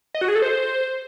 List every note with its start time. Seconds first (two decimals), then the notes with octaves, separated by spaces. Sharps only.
0.14 D#5
0.21 F#4
0.28 G#4
0.35 A4
0.42 C5